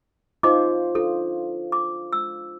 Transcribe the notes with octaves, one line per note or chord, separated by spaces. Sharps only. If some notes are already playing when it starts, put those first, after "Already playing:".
D#4 F4 C5 D#5 D6
D4 F4 A4
D6
E6